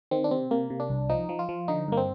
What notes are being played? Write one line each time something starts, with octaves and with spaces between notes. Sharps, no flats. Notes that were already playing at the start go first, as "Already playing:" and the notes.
D#3 C4
D4
C3 C4
C3 A#3
C3
D4
C2
F3 D#4
F3
F4
F3
D3 D#4
G2 A#3
C4